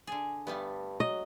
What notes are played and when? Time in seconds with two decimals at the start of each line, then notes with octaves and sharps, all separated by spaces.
0.07 D3 G#4
0.47 G2 G3 A3 B3
1.00 F#3 D#5